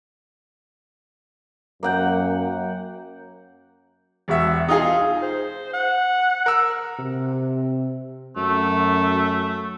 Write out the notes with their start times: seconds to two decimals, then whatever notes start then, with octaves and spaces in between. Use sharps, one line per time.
1.83 F#2 A#3 F#5 G5
4.28 E1 F#4 E5
4.68 D#4 F4 G#4
5.22 C5
5.74 F#5
6.46 A#4 E6
6.99 C3
8.37 F#2 A3